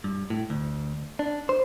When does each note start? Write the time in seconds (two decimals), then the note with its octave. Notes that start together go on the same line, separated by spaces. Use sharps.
0.04 G2
0.30 A2
0.50 D2
1.19 D4
1.49 C5